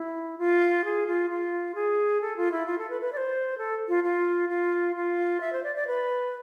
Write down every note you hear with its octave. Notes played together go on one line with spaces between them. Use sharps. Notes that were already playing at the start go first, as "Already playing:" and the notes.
Already playing: E4
F4
G#4
F4
F4
G#4
A4
F4
E4
F4
A4
B4
B4
D5
C5
A4
F4
F4
F4
F4
E5
C5
D5
D5
B4